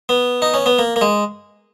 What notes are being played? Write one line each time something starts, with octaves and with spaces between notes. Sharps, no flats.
B3
D#4
C#4
B3
A#3
A#3
G#3